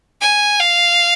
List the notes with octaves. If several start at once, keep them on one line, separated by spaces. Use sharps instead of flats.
G#5
F5